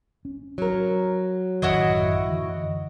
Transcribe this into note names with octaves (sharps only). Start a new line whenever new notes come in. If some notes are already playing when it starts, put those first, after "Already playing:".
C#4
F#3 A#4
A1 F#2 D#3 E4 F#4 D#5
F#2 D3 E3